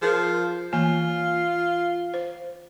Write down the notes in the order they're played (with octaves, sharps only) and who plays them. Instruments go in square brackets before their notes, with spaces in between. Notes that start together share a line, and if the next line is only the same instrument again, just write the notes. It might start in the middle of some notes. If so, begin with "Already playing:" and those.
[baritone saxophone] F3 [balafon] G#4 A#4
[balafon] E3 A#3 G#5 [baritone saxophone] F4
[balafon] C5